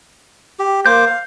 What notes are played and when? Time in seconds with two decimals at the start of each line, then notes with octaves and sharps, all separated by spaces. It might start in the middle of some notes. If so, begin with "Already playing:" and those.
0.59 G4
0.86 A#3 C5 D6 G6
1.06 F5